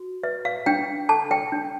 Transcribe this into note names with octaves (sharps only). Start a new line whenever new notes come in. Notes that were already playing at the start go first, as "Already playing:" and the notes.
Already playing: F#4
B4 E5
F5
D4 G5
A4 A5
G5
D4